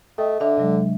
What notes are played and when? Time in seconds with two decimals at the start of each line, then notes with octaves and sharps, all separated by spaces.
0.18 A3 D#5 G5 D#6
0.40 D3 D4 E5
0.57 C3 F#3 G#3